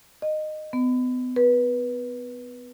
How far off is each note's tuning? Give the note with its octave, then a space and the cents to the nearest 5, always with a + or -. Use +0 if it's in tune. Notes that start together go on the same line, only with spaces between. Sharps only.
D#5 -15
B3 +35
B4 -20